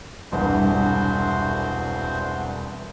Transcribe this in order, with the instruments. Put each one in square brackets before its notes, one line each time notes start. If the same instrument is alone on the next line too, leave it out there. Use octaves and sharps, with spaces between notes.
[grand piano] E1 C2 G2 [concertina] F#4 C5